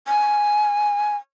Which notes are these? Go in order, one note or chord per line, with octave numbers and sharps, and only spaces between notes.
G#5